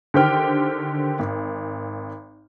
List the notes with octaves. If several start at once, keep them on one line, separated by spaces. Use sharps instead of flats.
D3 D#3 G4 C5 G5 F6
G#1